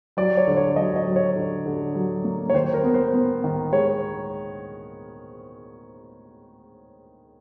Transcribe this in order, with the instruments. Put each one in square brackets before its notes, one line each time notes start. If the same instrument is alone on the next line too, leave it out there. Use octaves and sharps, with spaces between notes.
[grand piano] F#3 D5
C#5
D3
C#5
F#3 D#5
D#5
F#3
C#5
D3
D3
F#3
A#3
C#5
D#3 C5
A#4
B3
C5
B3
D#3
G#3 C#5